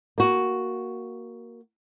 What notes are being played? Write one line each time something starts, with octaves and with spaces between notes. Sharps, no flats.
A#3 F#4